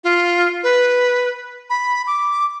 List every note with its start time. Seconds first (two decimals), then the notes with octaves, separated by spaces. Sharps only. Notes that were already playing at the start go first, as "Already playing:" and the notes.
0.04 F4
0.63 B4
1.70 B5
2.07 D6